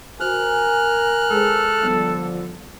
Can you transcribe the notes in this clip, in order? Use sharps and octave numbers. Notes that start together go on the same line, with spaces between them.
F#4 A#4 C5 G#5 F6 F#6
G#3 G#4 A4 C5
D3 F3 G3 B3